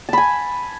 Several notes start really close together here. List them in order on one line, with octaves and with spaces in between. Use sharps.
A5 B5 G#5